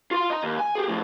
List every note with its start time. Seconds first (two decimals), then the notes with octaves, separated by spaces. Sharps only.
0.11 F4 C6
0.30 D#5 A#5
0.43 D#2
0.59 G#5
0.75 G4 G#4
0.88 A2 F3